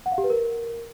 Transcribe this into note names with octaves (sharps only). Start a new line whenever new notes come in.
F#5
F5
G4
B4
A#4